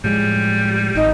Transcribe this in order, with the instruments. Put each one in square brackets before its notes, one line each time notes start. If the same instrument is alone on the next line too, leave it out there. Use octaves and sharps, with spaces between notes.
[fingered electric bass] A2 F3 G#3 [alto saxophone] G3
[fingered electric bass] G#1 [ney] D#4